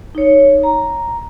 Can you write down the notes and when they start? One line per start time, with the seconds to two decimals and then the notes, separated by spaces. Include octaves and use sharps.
0.15 D#4 C#5
0.63 A#5